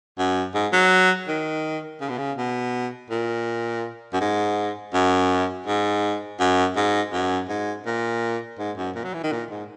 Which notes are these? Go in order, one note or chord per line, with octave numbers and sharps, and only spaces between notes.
F#2
G#2
F#3
D#3
C#3
B2
C#3
B2
A#2
F#2
G#2
F#2
G#2
F#2
G#2
F#2
G#2
A#2
G#2
F#2
A#2
F#3
E3
D#3
A#2
G#2